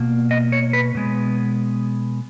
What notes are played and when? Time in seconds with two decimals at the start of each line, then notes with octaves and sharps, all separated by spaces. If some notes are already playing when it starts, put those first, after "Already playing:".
Already playing: B2 A#3
0.31 D#5
0.52 C#5
0.73 B4
0.95 B2 G#3 B3